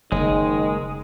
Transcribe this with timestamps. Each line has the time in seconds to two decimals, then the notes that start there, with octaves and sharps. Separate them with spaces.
0.12 F#1 D#3 G#3